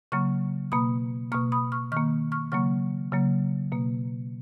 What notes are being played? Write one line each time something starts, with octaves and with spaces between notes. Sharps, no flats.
C#3 F#3 A#3 C#6 F6
B2 A#3 B5 D#6
B2 A#3 C#6 F6
B5 D#6
C#6 F6
D#3 A#3 C#6 F6
C#6 F6
C#3 F#3 A#3 C#6 F6
C#3 F#3 A#3
B2 A#3